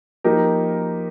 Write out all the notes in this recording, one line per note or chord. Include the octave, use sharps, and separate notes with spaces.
F3 A#3 D#4 G4 A#4